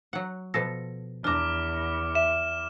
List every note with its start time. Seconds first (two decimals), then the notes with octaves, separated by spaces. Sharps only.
0.13 F#3 F#5
0.54 B2 F3 A4 A#6
1.24 E2 D4 A#5 D6 F6
2.15 E5 E7